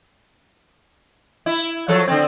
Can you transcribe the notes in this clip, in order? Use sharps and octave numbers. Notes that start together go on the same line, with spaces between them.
E4
F3 F#3 A4
D3 C4